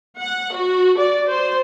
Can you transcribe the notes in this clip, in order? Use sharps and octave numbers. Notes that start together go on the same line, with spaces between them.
F#5
F#4
D5
C5